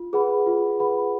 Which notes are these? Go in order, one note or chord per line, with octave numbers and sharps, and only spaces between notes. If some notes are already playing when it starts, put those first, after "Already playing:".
Already playing: F4
G#4 B4 F#5 B5
F4
G#4 B4 F#5 B5